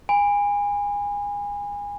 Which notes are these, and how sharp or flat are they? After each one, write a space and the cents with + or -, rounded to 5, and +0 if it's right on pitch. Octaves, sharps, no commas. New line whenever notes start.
G#5 -25 B5 +10